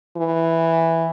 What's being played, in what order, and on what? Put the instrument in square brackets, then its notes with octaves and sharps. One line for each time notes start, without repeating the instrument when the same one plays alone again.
[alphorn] E3